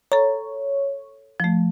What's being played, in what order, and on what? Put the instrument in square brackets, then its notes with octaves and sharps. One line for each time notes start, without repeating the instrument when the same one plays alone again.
[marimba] A4 A#5 [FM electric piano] C#5
[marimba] F3 A3